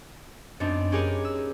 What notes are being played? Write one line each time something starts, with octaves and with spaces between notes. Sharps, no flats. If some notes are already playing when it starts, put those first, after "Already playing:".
F#2 B3 C4 D4 D#4
C#4 G4 G#4 A#4 B4 C#5
E6